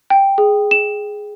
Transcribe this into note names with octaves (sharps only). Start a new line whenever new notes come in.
G5
G#4
E7